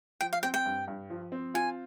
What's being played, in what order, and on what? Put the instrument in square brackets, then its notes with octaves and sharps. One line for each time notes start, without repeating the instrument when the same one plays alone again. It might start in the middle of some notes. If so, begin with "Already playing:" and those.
[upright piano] F3 [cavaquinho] G5
[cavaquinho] F5
[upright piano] C4 [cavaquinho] G5
[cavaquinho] G5
[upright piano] G2
G2
F3
C4
[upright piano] F4 [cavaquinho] G#5